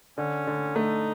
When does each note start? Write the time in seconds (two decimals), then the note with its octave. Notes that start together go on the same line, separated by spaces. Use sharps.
0.18 D3 C#4
0.47 D3
0.76 A3 D#4